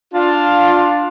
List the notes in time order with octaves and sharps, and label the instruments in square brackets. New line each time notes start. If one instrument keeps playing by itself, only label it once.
[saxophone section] D4 F4